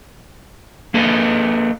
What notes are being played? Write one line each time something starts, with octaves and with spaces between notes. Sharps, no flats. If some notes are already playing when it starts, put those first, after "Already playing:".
A#3 A4 B4 D#5